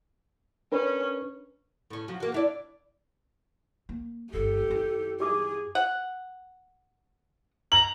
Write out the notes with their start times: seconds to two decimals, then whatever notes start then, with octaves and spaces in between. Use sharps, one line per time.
0.72 C#4 D4 A#4 B4
1.90 A2 C#4
2.08 F3 F#3
2.20 A#3 F#4
2.32 D4 E4 D5
3.89 A#3
4.33 G1 G#2 G4 A4
4.70 F#2 E4
5.20 G4 G#4 D6 D#6
5.75 F#5
7.72 A#5 F#7